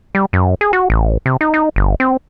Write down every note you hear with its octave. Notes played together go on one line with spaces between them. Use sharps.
G3
F#2
G#4
F#4
A1
C3
D#4
D#4
G1
C4